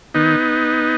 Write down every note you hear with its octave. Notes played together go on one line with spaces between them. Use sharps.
D#3 B3 D#4